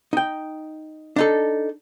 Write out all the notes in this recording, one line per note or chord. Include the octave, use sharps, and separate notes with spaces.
D#4 G5
D4 D#4 A4